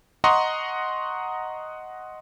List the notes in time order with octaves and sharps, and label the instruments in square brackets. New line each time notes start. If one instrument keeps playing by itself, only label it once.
[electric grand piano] D#5 F#5 A#5 C6 C#6 D#6